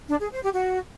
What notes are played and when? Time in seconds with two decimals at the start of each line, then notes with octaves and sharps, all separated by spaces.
0.08 D4
0.20 G#4
0.31 C5
0.42 G4
0.53 F#4